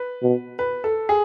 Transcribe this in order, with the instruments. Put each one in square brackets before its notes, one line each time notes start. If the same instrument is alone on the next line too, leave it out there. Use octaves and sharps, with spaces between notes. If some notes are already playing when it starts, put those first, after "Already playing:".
Already playing: [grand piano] B4
[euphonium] B2
[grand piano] B4
A4
G#4